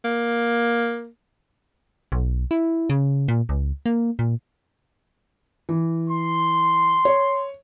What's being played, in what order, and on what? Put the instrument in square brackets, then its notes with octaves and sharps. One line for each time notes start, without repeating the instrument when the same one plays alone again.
[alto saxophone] A#3
[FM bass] B1
E4
C#3
A#2
C#2
A#3
A#2
[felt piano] E3
[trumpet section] C6
[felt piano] C#5